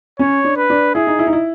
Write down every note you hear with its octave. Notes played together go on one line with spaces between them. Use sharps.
C#4 C#5
D4
B4
D4
E4 G#4
D#4
E4
D#4
E4